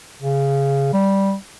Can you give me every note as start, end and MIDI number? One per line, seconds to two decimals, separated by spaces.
0.22 0.89 49
0.93 1.34 55